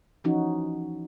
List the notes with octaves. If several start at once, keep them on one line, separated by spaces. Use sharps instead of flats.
E3 F3 C#4 D#4 F#4